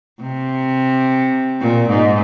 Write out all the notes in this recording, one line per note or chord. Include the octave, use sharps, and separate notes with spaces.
C3
A#2
G#2